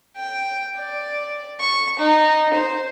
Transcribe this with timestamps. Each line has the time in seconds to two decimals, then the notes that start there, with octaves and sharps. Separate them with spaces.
0.17 G5
0.77 D5
1.60 C#6
1.99 D#4
2.54 C5